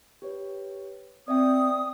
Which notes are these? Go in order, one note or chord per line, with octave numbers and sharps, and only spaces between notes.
G4 B4 C#5
C4 D5 E5 G5 D#6